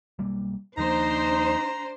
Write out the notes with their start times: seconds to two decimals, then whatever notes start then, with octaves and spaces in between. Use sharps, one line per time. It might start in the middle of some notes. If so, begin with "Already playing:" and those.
0.19 B1 G3 A#3
0.78 D#2 F3 A#3 D4 D#4 C5 A#5